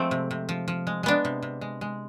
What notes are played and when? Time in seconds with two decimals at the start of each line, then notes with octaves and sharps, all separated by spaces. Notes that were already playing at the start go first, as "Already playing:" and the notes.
Already playing: F3 G#3 A3 C4
0.11 C3
0.31 C3
0.49 F3
0.68 F3
0.87 G#3
1.03 G#3 B3 D4
1.25 C3
1.42 C3
1.61 G#3
1.81 G#3